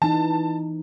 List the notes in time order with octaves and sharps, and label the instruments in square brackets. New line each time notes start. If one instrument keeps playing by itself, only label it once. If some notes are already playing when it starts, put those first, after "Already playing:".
[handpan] E3 D#4 [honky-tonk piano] A5